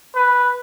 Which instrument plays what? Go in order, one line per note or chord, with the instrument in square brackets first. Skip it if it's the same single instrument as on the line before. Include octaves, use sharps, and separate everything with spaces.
[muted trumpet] B4